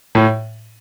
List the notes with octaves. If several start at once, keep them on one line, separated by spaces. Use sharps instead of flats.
A2